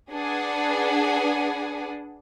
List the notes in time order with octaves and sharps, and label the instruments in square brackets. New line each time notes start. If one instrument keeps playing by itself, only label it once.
[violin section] D4 G#4 B4 F#5